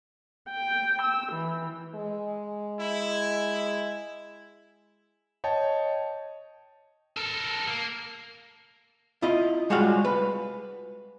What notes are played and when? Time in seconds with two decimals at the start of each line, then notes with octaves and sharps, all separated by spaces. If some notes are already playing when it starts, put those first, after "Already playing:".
0.49 G5
1.02 E6
1.32 E3
1.95 G#3
2.80 E4
5.44 C#5 D#5 G5 A5
7.17 A4 A#4
7.68 A#3
9.22 E4 F4 D#5
9.70 G3 G#3 F4 F#4 C#5 F5
10.05 B4